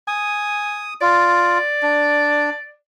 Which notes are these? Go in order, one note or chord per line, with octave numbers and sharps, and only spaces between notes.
G#5 D#6
F4 D5
D4